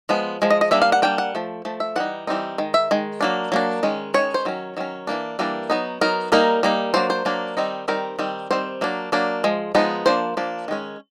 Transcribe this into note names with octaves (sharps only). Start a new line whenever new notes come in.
F3 G#3 B3
F3 G#3
D#5
D#5
G3 A#3 D4 E5
F5
F#5
G3 A#3 D4 G5
F#5
F3 A3
F3 A3
E5
E3 G3 D#4 F#5
E3 G3 C4 D#4
D#3 G#3
E5
D#3 G#3
F#3 A#3 D4
F#3 A#3 D4
D#3 G#3 C#4
D#3 G#3 C#4 C#5
C5
D#3 F#3 C#4
D#3 F#3 C#4
E3 G3 A#3 D4
E3 G3 A#3 D4
F#3 B3 D#4
F#3 B3 D#4 A#4
G3 A#3 D#4 A#4
G3 A#3 D#4
F#3 A#3 D4 C5
C5
F#3 A#3 D4
D#3 G3 C4 D#4
D#3 G3 C4 D#4 A#4
D#3 G3 C4
D#3 G3 C4 C5
F#3 A#3 D4
F#3 A#3 D4
F3 G#3
F3 G#3 B3 D#4
F3 A#3 D4 C5
F3 A#3 D4
D#3 G#3 C#4